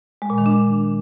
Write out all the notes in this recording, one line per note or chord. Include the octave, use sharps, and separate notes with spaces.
G#3
A#2
D#3
D4